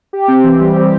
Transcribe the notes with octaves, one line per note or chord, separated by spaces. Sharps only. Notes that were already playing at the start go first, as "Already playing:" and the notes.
G4
C4
E3
G3
G4